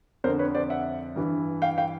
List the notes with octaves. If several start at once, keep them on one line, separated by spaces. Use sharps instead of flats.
F2 D3 A#4 C5
B4 C#5
C5 D5
E5 F#5
G2 E3
F5 G5
F5 G5